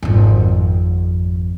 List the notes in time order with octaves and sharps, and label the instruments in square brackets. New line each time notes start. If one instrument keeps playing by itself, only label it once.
[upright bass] G#1 F2